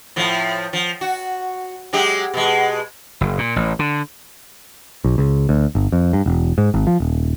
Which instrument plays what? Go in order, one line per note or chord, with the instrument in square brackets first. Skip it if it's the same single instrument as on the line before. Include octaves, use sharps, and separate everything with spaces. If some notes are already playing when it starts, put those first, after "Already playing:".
[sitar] A2 F3
F3
F#4
F#3 G#3 G4
B2 G#3
[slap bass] F#1
A#2
A1
D3
[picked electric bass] B1
C#2
D2
G1
F2
G2
E1
G#2
G#1
F3
D#1